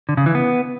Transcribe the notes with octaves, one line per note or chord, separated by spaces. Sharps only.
D3
C#3
E3
B3